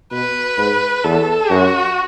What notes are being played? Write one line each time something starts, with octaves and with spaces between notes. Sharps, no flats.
B2 B4
G#2
E2 A4
F#2 F#4